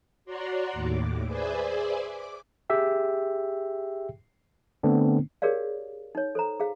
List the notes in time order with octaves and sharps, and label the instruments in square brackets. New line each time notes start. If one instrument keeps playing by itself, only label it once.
[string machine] F#4 C#5 D5 F#5 A#5 C6
D#2 A2 D6
G#4 B4 C5 D5 E5 G#5
D6
[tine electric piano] G4 G#4 E5 G5
D3 A3 B3 C4 D4
[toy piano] G4 G#4 A#4 C#5 D5 F5
D#4 C#5
A4 C5 A#5
G#4 F5